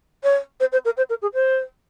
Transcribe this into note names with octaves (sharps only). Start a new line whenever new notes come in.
C#5
C5
C5
A#4
C5
A#4
G#4
C5